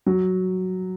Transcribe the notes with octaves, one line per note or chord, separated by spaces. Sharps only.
F#3